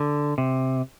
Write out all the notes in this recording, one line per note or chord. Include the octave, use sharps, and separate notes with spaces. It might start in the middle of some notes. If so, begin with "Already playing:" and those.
Already playing: D3
C3